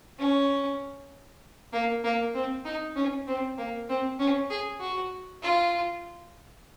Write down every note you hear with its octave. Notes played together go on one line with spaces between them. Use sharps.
C#4
A#3
A#3
C4
D#4
C#4
C4
A#3
C4
C#4
G#4
F#4
F4